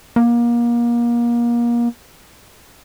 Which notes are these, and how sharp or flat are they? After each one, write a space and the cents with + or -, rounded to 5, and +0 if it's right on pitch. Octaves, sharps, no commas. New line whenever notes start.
A#3 +30